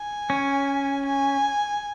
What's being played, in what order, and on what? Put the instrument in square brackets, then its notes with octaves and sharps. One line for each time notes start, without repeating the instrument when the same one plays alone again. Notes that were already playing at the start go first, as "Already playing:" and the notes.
Already playing: [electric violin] G#5
[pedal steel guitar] C#4
[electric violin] G#5